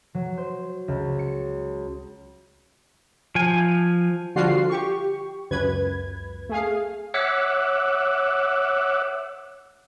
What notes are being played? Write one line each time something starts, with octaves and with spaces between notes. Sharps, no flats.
F#3
C5
C#2
C#7
F3 G#5
D3 F3 G3 F4 F#4 C7
G4 C#6
C#2 F#2 B4 G#6
A3 G#4 F5
C#5 E5 F#5 D6 E6 F#6